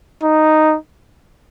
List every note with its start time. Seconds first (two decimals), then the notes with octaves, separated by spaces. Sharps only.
0.23 D#4